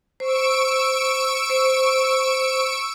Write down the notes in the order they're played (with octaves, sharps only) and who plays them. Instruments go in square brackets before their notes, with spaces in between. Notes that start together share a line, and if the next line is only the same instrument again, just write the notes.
[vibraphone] C5 [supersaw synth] C#6 E6 D7
[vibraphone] C5